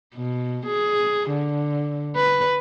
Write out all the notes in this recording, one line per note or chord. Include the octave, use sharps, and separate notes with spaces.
B2
G#4
D3
B4